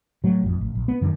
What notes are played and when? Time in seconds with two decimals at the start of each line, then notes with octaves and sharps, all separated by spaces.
0.24 A2 F#3
0.42 A1 F2
0.61 A1
0.75 A#1
0.88 B3
1.01 F#2 D3 D#3